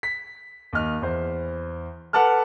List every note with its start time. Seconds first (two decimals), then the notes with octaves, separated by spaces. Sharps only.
0.03 B6
0.73 D#2 D#5 F6
1.01 E2 C5
2.13 A4 B4 F#5 A5 D6 F6